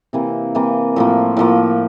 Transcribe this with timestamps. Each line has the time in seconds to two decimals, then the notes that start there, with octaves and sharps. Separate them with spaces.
0.13 C3 E3 A#3
0.55 C3 E3 A#3
0.96 A2 F3 A#3
1.37 A2 F3 A#3